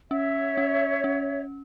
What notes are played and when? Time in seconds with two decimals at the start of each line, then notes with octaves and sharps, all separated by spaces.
0.10 C#4 C#5 E5
0.57 C#4
1.04 C#4